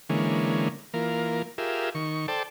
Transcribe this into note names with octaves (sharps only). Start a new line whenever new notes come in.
D3 E3 G#3 A#3 C#4
E3 A#3 F4 A#4
F4 G4 G#4 A#4 E5
D#3 C#6
A4 C5 D5 G5 A5